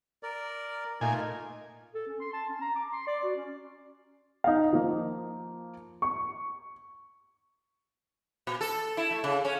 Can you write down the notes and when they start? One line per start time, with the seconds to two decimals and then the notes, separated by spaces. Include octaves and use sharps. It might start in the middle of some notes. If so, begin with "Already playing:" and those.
0.23 A#4 D5
1.01 A#2 A3 D#4 F4 G#5
1.94 A4
2.07 C#4
2.21 C6
2.34 A5
2.49 C#4
2.61 A#5
2.76 D6
2.92 C6
3.07 D5
3.24 F#4
3.36 C#4
4.44 D#4 F5
4.73 F3 A#3
6.02 C#6
8.47 A#2
8.61 A4
8.97 E4
9.11 A3
9.24 C#3
9.45 C#4